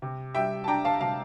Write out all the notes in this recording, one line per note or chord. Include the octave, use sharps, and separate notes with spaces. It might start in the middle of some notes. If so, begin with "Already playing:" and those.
C3
G3 E5 G5
A5
D4 G5 A#5
F5 A5
C3 F5 A5